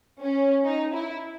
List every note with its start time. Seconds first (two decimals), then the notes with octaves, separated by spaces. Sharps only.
0.22 C#4
0.65 D#4
0.94 E4